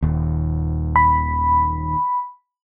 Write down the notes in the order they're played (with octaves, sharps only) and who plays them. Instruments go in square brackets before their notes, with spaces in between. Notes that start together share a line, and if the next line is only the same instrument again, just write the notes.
[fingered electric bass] D#1 D#2
[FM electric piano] B5